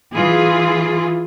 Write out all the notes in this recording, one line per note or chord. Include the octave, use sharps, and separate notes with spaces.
E3 F4 G#4